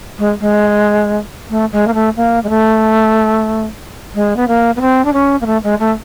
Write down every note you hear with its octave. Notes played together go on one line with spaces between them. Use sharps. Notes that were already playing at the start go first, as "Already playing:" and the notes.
G#3
G#3
A3
G#3
A#3
A3
A#3
G#3
A3
G#3
B3
A#3
B3
C4
D4
C#4
A#3
A3
G#3
A3